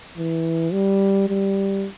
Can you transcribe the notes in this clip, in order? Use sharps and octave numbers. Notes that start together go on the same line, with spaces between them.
E3
G3
G3